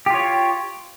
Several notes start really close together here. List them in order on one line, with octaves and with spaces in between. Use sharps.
G4 F4 C#5